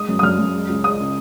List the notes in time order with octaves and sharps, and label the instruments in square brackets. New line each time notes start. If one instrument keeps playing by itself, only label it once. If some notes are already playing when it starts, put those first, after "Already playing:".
Already playing: [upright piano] G#3 D#6
F#2
D#6
F#2 F6
F#2
G#3
C#2
G#3 D#6
C#3